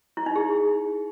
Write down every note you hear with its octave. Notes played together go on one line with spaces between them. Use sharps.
E4
D#4
G#4